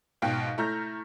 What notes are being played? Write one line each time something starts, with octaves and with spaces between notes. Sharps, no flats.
G#2 B2 F5 G5
A3 E4 A#5 F6 G6 A#6